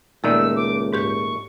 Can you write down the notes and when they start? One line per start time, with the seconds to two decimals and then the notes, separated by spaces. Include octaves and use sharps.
0.24 C#2 A#2 D#3 A3 A4 D5 E6
0.56 D6
0.93 G#2 G4 C#6 G6